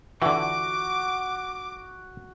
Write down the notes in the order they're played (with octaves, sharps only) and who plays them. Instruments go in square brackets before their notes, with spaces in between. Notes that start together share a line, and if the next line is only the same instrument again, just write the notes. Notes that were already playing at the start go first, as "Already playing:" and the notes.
[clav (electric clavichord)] D3 E3 [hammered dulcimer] F#4 [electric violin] D6